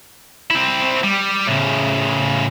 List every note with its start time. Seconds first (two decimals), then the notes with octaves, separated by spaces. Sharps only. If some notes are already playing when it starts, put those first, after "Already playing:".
0.51 C4 E4
1.03 G3
1.47 A2 C#3